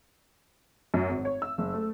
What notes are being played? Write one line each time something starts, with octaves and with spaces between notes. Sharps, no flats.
F#2
G#1
C#5
E6
F#1
A3